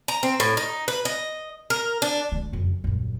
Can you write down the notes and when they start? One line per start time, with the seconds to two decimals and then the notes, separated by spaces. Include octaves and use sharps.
0.08 A#5
0.23 C4
0.40 A2
0.57 D#4
0.88 B4
1.05 D#5
1.70 A#4
2.02 D4
2.32 D2 D3
2.52 F#1 F2
2.84 D#1 F#2